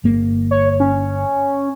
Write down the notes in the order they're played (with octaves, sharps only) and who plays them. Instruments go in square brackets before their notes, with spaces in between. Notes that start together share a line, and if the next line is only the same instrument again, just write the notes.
[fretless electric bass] G1 A#3
[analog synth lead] C#5
C#4